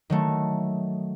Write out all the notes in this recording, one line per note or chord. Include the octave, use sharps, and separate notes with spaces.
D#3 F#3 A3